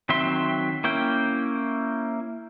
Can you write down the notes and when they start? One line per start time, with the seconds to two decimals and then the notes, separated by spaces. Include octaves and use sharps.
0.09 D#3 F#3 C4 E5 C6
0.84 A#3 C#4 E4 G5